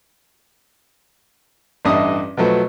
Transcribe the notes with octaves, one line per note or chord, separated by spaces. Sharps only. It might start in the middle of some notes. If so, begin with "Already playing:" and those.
A1 G2 D#5 E5 D#6
B2 F3 F#3 A3 B3